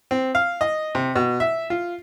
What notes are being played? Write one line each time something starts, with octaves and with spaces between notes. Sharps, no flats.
C4
F5
D#5
C3
B2
E5
F4